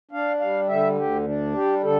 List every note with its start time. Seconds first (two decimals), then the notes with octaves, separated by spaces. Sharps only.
0.11 D4 F5
0.40 G3 F5
0.68 D3 E5
0.98 D2 G4
1.26 D4
1.54 G3 G4
1.83 D3 A4